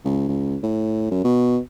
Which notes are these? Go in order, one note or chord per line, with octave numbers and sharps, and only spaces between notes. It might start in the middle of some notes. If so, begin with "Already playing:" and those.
C#2
C#2
A2
F#2
B2